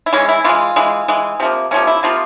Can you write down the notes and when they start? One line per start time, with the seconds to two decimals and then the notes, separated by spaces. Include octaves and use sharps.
0.06 E4
0.13 E3 G#3 C#4
0.28 E4
0.45 E3 G#3 F4
0.76 E3 G#3
1.08 E3 G#3
1.40 C3 F3 A#3
1.71 C3 F3 A#3 C#4
1.87 E4
2.03 C3 F3 A#3 F4